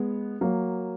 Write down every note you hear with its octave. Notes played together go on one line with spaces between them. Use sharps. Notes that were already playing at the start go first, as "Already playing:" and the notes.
Already playing: G#3 B3
F#3 A#3